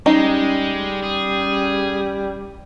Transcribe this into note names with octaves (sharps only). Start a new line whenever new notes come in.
G3 G#3 C#4 D#4
G#4